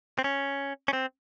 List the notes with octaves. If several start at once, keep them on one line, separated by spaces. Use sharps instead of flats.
C4
C#4
C#4
C4